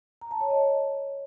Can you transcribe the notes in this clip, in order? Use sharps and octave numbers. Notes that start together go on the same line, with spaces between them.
A#5
A5
C#5
D#5